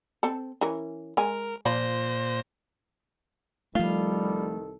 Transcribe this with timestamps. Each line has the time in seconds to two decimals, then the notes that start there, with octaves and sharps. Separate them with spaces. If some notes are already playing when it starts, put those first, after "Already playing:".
0.23 C4 A4
0.61 E3 C#4 A#4
1.17 G#3 A#4 G#5
1.65 A#2 F3 C5 D5 B5 A#6
3.75 C2 D#3 F3 G3 A3 F4 A4